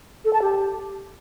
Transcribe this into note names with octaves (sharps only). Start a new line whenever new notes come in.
A4
A5
G4